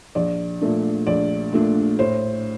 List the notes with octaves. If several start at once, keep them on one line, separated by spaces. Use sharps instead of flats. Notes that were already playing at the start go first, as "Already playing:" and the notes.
A#1 D5
A#2 A3 D4
A#1 D5
A#2 A3 D4
A2 C5